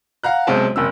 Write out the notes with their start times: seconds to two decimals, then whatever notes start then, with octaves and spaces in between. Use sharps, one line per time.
0.24 F5 F#5 A#5 F#6
0.47 B1 C3 G#3 C#4 C5 A5
0.76 F#1 C3 E6